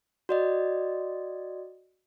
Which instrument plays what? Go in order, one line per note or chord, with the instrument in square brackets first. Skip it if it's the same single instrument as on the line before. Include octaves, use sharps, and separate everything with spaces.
[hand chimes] F#4 D5 D#5